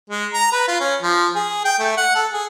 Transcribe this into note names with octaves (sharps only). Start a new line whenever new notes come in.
G#3
A#5
B4
F4
C#4
F3
G#4
G5
A3
F#5
A4
G#4